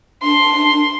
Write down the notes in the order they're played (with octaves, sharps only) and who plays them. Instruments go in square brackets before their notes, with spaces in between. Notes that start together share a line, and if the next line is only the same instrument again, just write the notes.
[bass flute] D4 [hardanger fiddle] C6